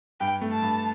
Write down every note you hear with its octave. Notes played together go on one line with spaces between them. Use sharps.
G2 G5
A3
A5
G2